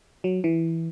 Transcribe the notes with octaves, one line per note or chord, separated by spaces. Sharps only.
F#3
E3